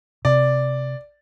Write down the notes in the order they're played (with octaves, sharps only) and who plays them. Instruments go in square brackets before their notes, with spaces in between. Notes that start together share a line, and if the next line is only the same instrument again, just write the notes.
[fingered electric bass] C3 [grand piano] D5